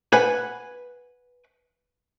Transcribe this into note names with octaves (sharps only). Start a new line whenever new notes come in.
B4 F#5 G#5